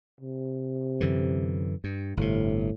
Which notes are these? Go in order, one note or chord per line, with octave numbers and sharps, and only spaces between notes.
C3
F#2 D3 E3
G2
G1 A2 C3